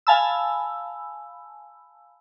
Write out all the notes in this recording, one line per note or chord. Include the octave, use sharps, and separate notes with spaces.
F5 G#5 A5 B5 E6